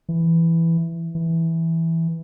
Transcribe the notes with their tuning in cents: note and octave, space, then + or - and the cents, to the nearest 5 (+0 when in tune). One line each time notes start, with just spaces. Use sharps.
E3 +5
E3 -5